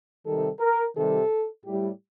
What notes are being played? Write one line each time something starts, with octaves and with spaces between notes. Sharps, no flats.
C3 D#3 G3 A4
A#4
C3 D#3 G3 A4
A2 G3 G4